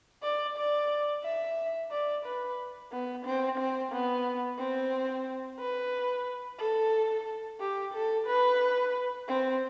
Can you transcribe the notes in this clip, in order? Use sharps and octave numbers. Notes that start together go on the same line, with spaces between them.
D5
D5
E5
D5
B4
B3
C4
C4
B3
C4
B4
A4
G4
A4
B4
C4